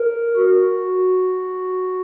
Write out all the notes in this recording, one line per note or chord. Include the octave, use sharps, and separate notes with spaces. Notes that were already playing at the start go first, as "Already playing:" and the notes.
Already playing: A#4
F#4